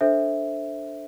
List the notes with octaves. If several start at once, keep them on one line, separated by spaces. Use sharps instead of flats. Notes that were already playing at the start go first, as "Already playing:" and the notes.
D4 A4 C5 E5